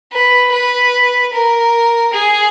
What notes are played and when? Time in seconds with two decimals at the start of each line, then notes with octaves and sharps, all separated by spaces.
0.12 B4
0.52 B4
1.33 A#4
2.13 G#4